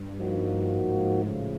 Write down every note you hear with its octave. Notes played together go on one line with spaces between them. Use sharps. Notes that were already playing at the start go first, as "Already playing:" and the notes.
Already playing: G2
F3 A#3 D#4 F#4
G#2
A2 C#3 F3 A3